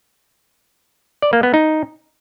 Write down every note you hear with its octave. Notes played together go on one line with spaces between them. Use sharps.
D5
A#3
B3
D#4